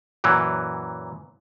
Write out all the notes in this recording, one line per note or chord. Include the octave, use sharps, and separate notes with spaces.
F#2 A#2 E3 F#3